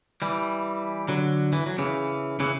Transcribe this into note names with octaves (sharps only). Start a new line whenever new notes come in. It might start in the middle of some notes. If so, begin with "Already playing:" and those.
E3 G3
D3 F#3
E3
F#3
C#3 E3
C#3 E3